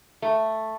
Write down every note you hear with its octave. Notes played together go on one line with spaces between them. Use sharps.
A3